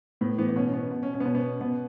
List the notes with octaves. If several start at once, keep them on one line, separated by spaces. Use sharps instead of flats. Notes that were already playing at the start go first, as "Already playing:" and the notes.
A2 B3
E3 B3
B3
B2 C#4
C#4
B3
B2
C#4
C#4
B3
B2 C#4
B3
C#4
B2 B3